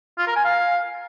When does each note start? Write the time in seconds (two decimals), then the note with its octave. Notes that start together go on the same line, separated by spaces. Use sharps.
0.18 F4
0.27 A#4
0.36 G#5
0.45 F5